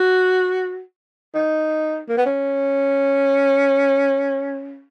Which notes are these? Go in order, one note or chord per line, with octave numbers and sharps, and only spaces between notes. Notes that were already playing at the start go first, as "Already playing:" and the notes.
Already playing: F#4
D#4
A#3
B3
C#4